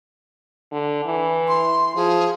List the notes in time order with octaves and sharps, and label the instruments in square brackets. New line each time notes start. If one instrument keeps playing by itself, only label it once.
[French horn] D3
E3
[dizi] C6
[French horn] F3 [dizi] G#4